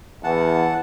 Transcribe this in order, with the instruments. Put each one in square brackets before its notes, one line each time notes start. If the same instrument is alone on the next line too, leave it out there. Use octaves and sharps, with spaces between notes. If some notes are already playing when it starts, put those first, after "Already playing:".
[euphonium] E2 [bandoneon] E3 F#5 A5